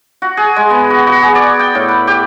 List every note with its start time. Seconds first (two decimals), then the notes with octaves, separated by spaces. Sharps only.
0.22 F#4
0.37 G#4
0.56 G#3
0.70 B3
0.90 F#4
1.07 F#4
1.22 G#4
1.35 D5
1.59 G5
1.75 A2
1.88 B4
2.07 G4